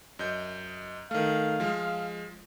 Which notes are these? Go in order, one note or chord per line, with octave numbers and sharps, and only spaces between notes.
F#2 D#5 G6
D#3 A3 F5
F3 G#3